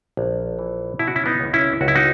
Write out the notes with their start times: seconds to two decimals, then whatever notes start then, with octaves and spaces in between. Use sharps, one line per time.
0.17 A#1
0.59 E3
0.99 B2 E4
1.07 F#4
1.16 C#4 E4
1.26 B3 D#4
1.39 C#2
1.54 C#4 E4
1.81 C#2 F#4
1.88 E4
1.95 D#4 F#4